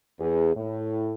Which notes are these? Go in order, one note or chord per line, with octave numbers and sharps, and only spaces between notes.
E2 G#4
A2